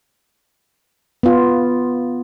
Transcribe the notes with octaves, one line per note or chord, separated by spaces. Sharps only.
B3 F4